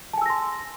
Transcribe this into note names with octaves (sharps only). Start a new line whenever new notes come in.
G#5 A5 C6 E6 A#6